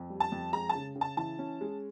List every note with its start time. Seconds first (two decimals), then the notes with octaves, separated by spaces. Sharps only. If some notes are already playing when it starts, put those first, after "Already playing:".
Already playing: F2
0.10 G3
0.20 A5
0.32 F2
0.53 G#3 A#5
0.69 A5
0.75 C#3
0.96 C#3
1.01 A5
1.17 E3 A5
1.39 C#4
1.61 G#3